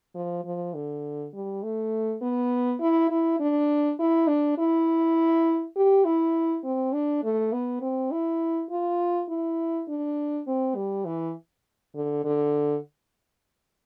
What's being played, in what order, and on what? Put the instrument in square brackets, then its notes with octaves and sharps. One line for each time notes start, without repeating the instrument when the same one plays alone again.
[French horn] F3
F3
D3
G3
A3
B3
E4
E4
D4
E4
D4
E4
G4
E4
C4
D4
A3
B3
C4
E4
F4
E4
D4
C4
G3
E3
D3
D3